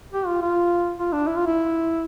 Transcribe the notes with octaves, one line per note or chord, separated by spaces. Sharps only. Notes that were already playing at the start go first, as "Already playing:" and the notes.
G4
F4
F4
F4
D4
E4
F4
E4